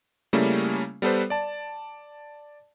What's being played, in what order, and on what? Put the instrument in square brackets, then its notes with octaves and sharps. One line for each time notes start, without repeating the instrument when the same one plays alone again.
[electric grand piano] C#3 G3 A3 A#3 C#4 E4
G3 B3 A4 B4 C5
D5 A5